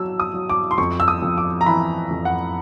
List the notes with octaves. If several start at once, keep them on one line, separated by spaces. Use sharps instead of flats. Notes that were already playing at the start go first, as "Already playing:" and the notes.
Already playing: F#3 E6
D#6
F#3
D6
C6
F2 C#6
E6
D#6
F2
D6
A#5
E3 B5
F2
F#5